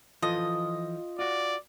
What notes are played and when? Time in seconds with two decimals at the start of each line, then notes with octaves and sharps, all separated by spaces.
0.22 E3 F3 F4 A4 D#5
1.19 F4 F#4 D5